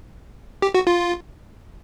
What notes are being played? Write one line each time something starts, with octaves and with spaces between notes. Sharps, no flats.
G4
F#4
F4